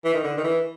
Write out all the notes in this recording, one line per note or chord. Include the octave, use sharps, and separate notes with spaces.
E3
D#3
D3
D#3
E3